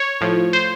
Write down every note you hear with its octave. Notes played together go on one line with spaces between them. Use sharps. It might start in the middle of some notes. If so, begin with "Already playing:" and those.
Already playing: C#5
A2 F3
C5